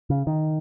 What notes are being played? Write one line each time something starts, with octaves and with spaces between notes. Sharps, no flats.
C#3
D#3